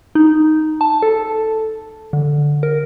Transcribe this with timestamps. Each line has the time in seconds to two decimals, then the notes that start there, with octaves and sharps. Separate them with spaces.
0.15 D#4
0.81 A5
1.02 A4
2.13 D3
2.63 A#4